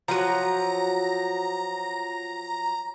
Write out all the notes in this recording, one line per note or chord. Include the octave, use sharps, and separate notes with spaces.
F3 F#3 A#5